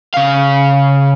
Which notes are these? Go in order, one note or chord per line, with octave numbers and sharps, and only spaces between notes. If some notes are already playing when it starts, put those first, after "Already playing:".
C#3 F5